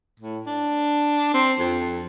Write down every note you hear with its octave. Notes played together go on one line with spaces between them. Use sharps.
A2
D4
C4
F2